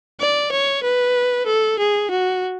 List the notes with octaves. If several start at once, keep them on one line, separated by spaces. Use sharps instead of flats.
D5
C#5
B4
A4
G#4
F#4